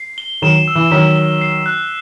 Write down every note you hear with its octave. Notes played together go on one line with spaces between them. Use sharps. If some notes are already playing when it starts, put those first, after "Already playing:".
Already playing: C7
G7
D#3 F#3 E7
E6
E3
D#3 F#3 B6
G7
C7
F#6